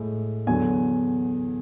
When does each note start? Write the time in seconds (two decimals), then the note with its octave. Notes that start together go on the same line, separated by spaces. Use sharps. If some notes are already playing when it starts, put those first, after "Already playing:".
Already playing: A2 G#3
0.47 E2 D3 F#3 G#5